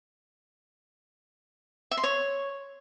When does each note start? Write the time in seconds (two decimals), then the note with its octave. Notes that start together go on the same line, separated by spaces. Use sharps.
1.91 E5
1.97 C6
2.04 C#5